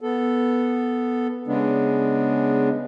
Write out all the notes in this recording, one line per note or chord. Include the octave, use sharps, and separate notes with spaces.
B3 A4
C#3 G#3 B3 D4